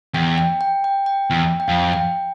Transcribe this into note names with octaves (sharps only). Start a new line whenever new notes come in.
E2 G5
G5
G5
G5
G5
E2
G5
F2 F5
G5